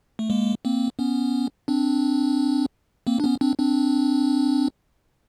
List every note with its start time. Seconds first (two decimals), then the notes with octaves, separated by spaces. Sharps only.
0.19 A3
0.30 G#3 A#3
0.65 A#3 C4
0.99 B3 C#4
1.68 C4 D4
3.07 A#3 C4
3.20 D4
3.24 B3 C#4
3.41 C4 D4
3.59 C4 D4